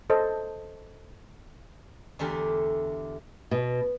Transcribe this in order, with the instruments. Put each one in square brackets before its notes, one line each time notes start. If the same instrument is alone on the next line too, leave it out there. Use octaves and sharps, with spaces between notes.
[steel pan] A4 C5 D#5
[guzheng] E2 D3 A3 G4 A4 A#4
[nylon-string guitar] B2